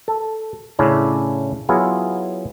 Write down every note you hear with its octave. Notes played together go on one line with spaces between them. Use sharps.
A4
A2 C#3 C#4 D4 E4
F#3 B3 E4 F4 G#4